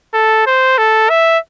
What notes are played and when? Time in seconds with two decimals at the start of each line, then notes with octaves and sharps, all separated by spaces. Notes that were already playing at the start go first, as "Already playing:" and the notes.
0.14 A4
0.46 C5
0.78 A4
1.10 E5